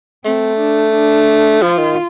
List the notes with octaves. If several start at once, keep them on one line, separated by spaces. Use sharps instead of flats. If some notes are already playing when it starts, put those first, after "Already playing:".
A3 C4
D4
D4
F3 F4
D#3